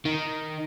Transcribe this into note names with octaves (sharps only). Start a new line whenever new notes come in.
D#3